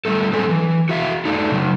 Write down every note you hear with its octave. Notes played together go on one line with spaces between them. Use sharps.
D3 G3 A3 A4
D3 F#3 C4 G#4 A4
E3
F#4 G#4 E5 F5
A3 D4 D#4
C#3 F#3